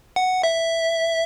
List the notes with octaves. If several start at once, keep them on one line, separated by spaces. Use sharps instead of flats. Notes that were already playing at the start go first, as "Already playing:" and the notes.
F#5
E5